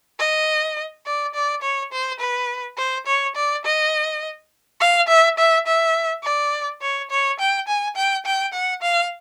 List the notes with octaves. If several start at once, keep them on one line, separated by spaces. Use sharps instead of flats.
D#5
D5
D5
C#5
C5
B4
C5
C#5
D5
D#5
F5
E5
E5
E5
D5
C#5
C#5
G5
G#5
G5
G5
F#5
F5